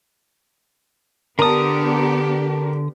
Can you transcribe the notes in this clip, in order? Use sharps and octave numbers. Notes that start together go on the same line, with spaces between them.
D3 B3 D4 G4 A#4 A5 D#6